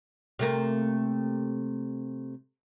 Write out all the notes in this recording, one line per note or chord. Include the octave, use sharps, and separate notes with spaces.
C3 A3 A#3